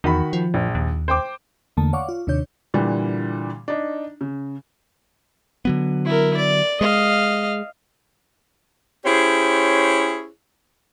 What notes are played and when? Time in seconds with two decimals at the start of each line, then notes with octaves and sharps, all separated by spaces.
0.04 E2 D#3 F#4 B5
0.33 F3
0.54 A#1
0.75 D#2
1.08 C5 G5 D6
1.77 E2 D3 A3 A#3 A5
1.93 C#5 D5 F5 F#5 C#6 D6
2.09 F4
2.27 D#2 C3 D#3 D4 C#5 G6
2.74 A#2 D3 E3 G3
3.68 D4 D#4
4.21 C#3
5.65 D3 F#3 B3
6.05 E4 A#4
6.36 D5
6.81 G#3 D#5 F5
9.05 C#4 E4 G4 G#4 C5 C#5